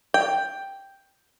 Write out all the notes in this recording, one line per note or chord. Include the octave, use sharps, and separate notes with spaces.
G5